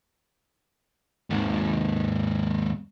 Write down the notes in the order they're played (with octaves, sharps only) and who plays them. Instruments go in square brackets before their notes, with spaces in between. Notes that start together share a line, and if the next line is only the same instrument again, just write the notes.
[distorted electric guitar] D#2 G#2